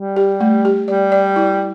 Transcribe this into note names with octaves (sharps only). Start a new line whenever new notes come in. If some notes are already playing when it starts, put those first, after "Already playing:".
Already playing: G3
G4
A3
G4
G3 D5
D5
E4